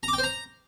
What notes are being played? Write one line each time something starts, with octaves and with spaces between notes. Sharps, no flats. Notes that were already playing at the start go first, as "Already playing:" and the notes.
A#5
D6
G5
C5
A#5